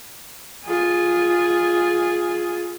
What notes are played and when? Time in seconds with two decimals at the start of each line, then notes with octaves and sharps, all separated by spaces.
0.65 F4 G#4